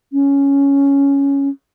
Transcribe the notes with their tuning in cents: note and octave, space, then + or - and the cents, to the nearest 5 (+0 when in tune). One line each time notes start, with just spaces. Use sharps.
C#4 +5